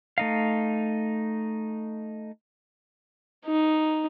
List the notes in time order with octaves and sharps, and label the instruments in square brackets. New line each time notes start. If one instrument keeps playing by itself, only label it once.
[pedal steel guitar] A3 D#4 F5
[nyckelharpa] D#4